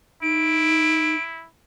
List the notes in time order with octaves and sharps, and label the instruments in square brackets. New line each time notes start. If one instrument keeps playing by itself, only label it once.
[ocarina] D#4 [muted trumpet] E4 [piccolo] D7